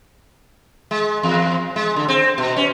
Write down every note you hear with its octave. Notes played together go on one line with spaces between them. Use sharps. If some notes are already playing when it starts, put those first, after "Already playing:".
G#3
E2
G#3
D3
C4
B2
C#4